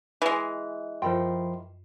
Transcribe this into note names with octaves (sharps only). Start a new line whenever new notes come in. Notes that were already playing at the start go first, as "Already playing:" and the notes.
E3 G#3
F#2 F3 A4 A#4 G5 B5 C6